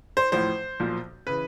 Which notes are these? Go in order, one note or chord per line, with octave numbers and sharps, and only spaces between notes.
C5
A1 A2 F3 C5
B1 A#2 F3
C#3 E3 B4